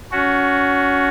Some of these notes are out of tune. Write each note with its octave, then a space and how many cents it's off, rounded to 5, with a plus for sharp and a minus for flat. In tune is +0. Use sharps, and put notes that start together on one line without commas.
C#4 +20 F#4 +0